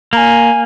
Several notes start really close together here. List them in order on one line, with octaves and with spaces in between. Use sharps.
A#3 A#5 G#5